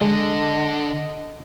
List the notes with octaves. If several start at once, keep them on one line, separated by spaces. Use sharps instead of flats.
D3 G#3 D#5